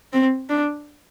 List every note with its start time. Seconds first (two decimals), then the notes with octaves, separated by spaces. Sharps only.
0.13 C4
0.50 D4